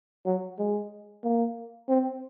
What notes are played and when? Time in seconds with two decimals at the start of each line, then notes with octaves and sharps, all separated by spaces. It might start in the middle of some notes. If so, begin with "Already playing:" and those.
0.26 F#3
0.58 G#3
1.24 A#3
1.88 C4